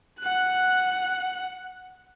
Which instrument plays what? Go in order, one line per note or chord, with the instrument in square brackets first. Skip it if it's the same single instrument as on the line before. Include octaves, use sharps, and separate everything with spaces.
[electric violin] F#5 F#6